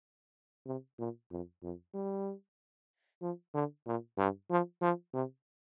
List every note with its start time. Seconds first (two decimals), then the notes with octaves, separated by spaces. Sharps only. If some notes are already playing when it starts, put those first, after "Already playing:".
0.66 C3
0.99 A#2
1.31 F2
1.63 F2
1.94 G3
3.21 F3
3.54 D3
3.86 A#2
4.18 G2
4.50 F3
4.82 F3
5.13 C3